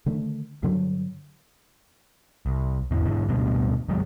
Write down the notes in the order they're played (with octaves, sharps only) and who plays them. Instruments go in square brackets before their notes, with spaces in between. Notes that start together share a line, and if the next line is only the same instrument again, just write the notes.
[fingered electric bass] D3 D#3 A3
G2 D3 F#3
[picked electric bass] C2
G#1 E2 D3 E3
G#2 D3 E3
A1 D2 G2 B2
F#1 D#3 F#3 G#3